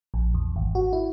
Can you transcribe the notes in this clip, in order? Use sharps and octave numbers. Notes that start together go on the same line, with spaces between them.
A#1
E2
G#1
F#4
E4